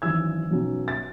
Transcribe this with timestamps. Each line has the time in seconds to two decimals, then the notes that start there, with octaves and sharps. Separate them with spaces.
0.02 G#1 F#2 E3 E6 G#6
0.51 B1 B2 F#3 C#4
0.88 A6